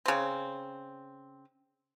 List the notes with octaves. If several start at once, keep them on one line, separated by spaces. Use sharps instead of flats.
C#3 C4